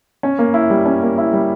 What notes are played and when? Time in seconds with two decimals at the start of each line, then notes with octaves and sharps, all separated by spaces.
0.23 C#4
0.39 A#3
0.54 E4
0.70 G3
0.86 C#4
1.02 A#3
1.18 E4
1.33 G3